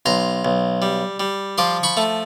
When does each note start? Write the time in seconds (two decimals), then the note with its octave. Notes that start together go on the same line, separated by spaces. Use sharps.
0.06 B1 A#5 C6
0.45 B1
0.82 G3
1.20 G3
1.58 F3 C6 D6
1.83 B5 C#6
1.97 A3